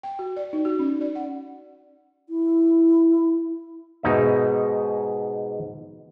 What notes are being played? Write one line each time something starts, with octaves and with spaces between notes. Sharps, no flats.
G5
F#4
D5
D#4
F#4
C#4
D5
F#5
E4
G#2 B2 D#4 E5